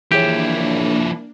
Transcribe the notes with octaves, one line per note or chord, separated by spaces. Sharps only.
E3 F3 A#3 D4 E4 G4 G#4 C#5